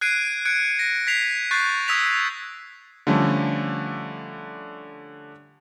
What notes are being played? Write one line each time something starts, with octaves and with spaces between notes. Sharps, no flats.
F#6 G#6 C7 D7 D#7
F#6 G#6 C#7 D7
A#6 D7
G#6 B6 C7 F7
C#6 F#6 G6 A6 C7
D#6 E6 G#6 B6 F7
D3 F3 G3 A3 C#4